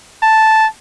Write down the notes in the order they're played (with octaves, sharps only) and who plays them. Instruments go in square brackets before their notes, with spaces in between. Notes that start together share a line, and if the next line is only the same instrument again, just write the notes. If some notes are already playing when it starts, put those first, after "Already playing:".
[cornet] A5